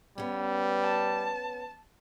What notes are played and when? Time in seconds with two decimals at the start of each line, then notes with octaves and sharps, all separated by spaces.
0.18 G3 B3 C#4
0.83 A5